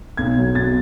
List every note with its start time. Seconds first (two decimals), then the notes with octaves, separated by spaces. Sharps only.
0.17 B1 G#6
0.36 B2 F#3
0.55 B1 A6